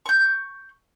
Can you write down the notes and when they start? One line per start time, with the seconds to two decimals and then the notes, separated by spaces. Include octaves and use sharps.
0.06 C#6 G6